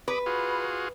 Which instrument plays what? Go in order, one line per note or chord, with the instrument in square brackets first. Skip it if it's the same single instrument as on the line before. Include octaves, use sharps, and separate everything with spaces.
[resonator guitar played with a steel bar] B4 [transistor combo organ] B5 D6 D#6
[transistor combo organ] F4 F#4 G#4